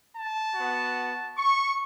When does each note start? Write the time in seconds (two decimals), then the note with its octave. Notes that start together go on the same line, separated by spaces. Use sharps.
0.15 A5
0.55 F#4
0.60 B3
1.37 C#6